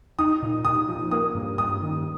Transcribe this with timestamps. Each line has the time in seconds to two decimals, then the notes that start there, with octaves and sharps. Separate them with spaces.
0.19 D#4 D#6
0.42 A#2
0.65 A#2 D#6
0.88 F3
1.11 A#3 D#6
1.35 G2
1.58 G2 D#6
1.82 D#3